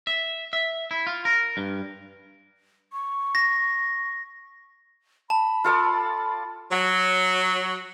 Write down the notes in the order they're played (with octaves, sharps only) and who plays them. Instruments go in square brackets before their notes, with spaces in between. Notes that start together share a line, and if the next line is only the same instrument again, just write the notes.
[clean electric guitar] E5
E5
E4
F4
A#4
G2
[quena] C#6
[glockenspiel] A#6
[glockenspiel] A5 [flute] B5
[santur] F4 A4 D5
[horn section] F#3